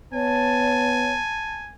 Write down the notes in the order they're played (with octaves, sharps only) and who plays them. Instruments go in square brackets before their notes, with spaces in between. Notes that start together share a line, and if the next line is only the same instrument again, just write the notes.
[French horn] B3 [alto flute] C#5 [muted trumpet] G#5 [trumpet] A5